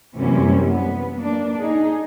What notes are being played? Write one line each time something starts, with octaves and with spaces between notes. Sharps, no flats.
F#2 C3 E3 G3 A#3 C#4
B3
A#3 D4
D#4 G#4